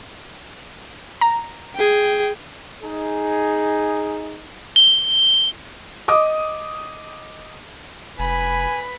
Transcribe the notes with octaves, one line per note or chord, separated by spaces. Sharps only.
A#5
G#4 G5
D#4 G#4
G7
D#5 D6 D#6
F1 B4 G#5 B5